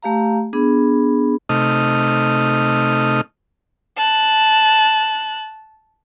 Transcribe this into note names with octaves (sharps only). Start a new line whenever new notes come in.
A3 G4 F5 A#5
B3 D4 G#4 B5
C3 A3 D#4 D#5 F6
A5 F#6